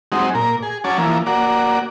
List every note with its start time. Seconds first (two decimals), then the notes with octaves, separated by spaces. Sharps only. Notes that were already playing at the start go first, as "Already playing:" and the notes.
0.12 F#3 G#3 C4 D#4
0.35 A#2 A#4
0.63 G#4
0.84 F#3 C#4 G#5 A5 D6
0.98 E3 F3 A#3
1.26 A#3 F#4 D5